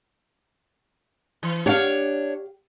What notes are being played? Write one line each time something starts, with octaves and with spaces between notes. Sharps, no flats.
E3
D4 G4 C#5 F5